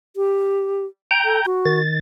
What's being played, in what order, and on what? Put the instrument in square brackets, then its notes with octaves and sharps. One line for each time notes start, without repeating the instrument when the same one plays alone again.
[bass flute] G4
[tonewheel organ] G5 A#5 G6
[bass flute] A4
F#4
[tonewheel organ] D#3 A6